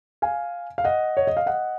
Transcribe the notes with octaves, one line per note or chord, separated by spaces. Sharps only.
F5 G#5
F5
D#5 F#5
C#5
D#5
F5
D#5 F#5